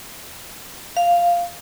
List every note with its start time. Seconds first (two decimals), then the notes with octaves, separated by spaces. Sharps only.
0.97 F5